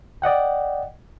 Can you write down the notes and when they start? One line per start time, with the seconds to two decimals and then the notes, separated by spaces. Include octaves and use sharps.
0.22 D5 D#5 F#5 G5